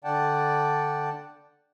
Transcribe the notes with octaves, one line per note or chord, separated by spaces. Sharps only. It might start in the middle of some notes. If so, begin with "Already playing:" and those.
D3 D5 F#5 G5 A5